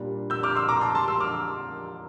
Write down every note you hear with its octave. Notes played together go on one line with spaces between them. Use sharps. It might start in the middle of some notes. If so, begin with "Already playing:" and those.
Already playing: A#2 G3 D4
E6 G6
D6 F6
C6 E6
A#5 D6
A5 C6
A5 C6
C6 E6
D6 F6